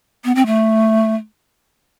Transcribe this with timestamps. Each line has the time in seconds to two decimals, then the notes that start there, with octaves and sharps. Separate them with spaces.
0.24 B3
0.35 C4
0.46 A3